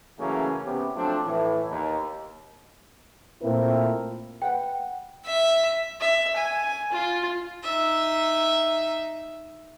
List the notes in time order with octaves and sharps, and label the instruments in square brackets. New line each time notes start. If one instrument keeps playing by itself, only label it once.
[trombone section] C#3 E3 F#3 A3 A#3 C#4
C3 B3 C#4 G4
F3 F#3 A3 C4 D4
A2 E3
D#2
[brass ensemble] A#2 A3 A#3 C4 E4 A#4
[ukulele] B4 F#5 [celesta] G5
[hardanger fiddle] E5
E5
G#5
F4
D#4 E5